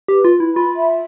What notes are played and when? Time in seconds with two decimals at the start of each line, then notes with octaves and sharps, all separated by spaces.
0.08 G4 B4
0.25 F4
0.35 B4
0.40 E4
0.55 F4 B5
0.77 E5